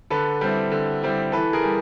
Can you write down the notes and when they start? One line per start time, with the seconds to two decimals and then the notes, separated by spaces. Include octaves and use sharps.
0.10 D3 A4 B4
0.41 G3 C4 E4
0.72 D3
1.02 G3 C4 E4
1.32 E3 A4 B4
1.53 G#4 A#4
1.63 G3